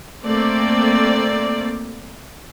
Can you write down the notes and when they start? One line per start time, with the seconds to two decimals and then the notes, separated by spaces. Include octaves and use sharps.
0.24 A3 A#3 C4 D5